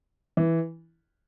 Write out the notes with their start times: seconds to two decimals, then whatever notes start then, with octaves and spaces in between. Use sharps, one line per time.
0.37 E3